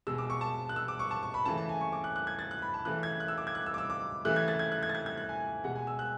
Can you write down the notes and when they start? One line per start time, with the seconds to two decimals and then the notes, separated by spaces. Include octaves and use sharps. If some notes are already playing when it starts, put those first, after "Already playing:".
0.07 B2 G#3 E6
0.18 D6
0.30 C#6
0.41 A5
0.69 F#6
0.76 E6
0.88 D6
0.99 C#6
1.11 A5
1.23 C#6
1.34 B5
1.45 C#3 E3 A3 A5
1.58 A5
1.69 G#5
1.81 C#6
1.92 D6
2.04 F#6
2.16 F#6
2.27 G#6
2.39 A6
2.51 F#6
2.62 B5
2.74 A5
2.85 C#3 E3 A3 F#6
3.03 G#6
3.20 F#6
3.28 E6
3.38 D6
3.47 G#6
3.55 F#6
3.66 E6
3.74 D6
3.78 E6
3.90 D6
4.25 C#3 E3 A3 F#6
4.36 G#6
4.48 A6
4.59 G#6
4.72 F#6
4.83 G#6
4.89 A6
4.95 G#6
5.06 G#6
5.17 F#6
5.29 G#5
5.64 B2 G#3 F#5
5.75 G#5
5.87 E6
5.99 F#6